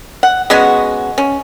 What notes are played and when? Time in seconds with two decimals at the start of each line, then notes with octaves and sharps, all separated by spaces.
0.23 F#5
0.50 G#3 B3 C#4 F#4
1.18 C#4